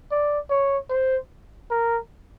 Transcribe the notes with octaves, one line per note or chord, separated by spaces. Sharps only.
D5
C#5
C5
A#4